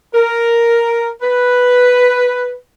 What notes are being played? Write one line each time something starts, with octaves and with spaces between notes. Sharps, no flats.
A#4
B4